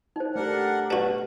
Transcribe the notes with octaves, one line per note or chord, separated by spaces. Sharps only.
D#4 C5
A3 D4 G4 A#4 F#5
B2 D4 F#4 B4 D5